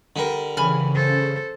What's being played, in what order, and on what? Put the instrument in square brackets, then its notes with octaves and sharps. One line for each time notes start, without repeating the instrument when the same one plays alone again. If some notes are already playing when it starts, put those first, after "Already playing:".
[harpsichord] D3 G3 A#4
[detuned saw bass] C#3 [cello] E3 [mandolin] G#5 B5 F6
[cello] A4 C5